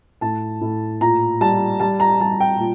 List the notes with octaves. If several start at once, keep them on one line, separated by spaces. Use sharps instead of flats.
A2 A5
A2
A#2 A#5
G3 A5
G3 A5
A#5
G3 A5
G5
A#2